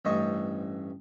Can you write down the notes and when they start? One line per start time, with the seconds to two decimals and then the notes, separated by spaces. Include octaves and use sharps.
0.05 A1 G2 C5 C#5 D#5 C#6